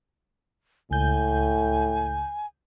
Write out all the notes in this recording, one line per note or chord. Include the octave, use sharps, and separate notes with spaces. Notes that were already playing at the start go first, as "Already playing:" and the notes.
C#2 A2 G#5 G6